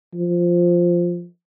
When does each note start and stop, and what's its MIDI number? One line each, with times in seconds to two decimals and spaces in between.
0.15 1.26 53